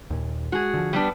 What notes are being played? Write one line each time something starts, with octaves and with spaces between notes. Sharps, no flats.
D#2 A#2
G#3 F#4 G#4
D3 F3
G3 B3 D4